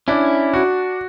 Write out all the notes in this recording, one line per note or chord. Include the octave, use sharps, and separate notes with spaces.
C#4 D4 E4
F#4